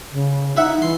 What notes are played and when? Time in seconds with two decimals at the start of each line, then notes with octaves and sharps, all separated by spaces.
0.12 C#3
0.57 D#4 E4 E5 F#5
0.82 E3 C6